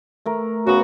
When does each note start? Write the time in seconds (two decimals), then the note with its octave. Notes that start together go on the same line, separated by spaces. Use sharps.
0.26 A3 A#4
0.67 C#3 B3 F#4